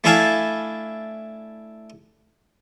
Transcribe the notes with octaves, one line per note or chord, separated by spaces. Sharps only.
A3 D4 E4 F5 G#5 A5